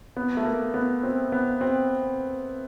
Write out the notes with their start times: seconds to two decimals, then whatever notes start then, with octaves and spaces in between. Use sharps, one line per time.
0.17 B3
0.37 A3
0.45 A#3
0.74 B3
1.03 C4
1.32 B3
1.61 C4